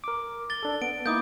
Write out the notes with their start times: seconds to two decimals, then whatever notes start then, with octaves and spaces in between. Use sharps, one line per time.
0.04 A#4 D6
0.50 A6 G7
0.63 D4 A4
0.82 B3 D7
1.06 A#3 D#4 E4 D6 D#6 G6